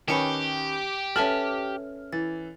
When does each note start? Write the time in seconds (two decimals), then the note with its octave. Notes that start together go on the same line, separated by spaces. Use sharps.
0.08 D#3 C#4 G4 B4 A5 C#7 G7
1.16 C#4 A4 B4 E5 A5 F6
2.12 E3 A6